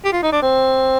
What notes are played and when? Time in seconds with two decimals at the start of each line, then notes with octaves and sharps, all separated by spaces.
0.05 G4
0.12 F4
0.23 D#4
0.32 D4
0.42 C4